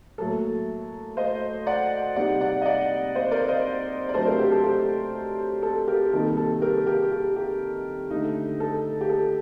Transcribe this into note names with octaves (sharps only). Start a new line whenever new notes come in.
A2 F#3 A#3 A4
C5 D#5
D5 F#5
C3 G3 C4 D#4 D5 F#5
D5 F#5
D#5
D5 F#5
C5 D#5
A#4 D5
C5 D#5
D5
C3 F#3 A3 D4 A4 C5
G4 A#4
G4
A4
G4
A4
G4 A#4
C3 D#3 G3 A#3 D#4 A4
A4
G4 A#4
G4 A#4
G4
G4
D3 A3 D#4
A4
G4
A4